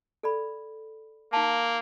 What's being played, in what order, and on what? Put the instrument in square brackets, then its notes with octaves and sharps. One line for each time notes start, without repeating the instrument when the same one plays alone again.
[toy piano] A4 D5 B5
[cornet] A#3 [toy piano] D#4 F5 A5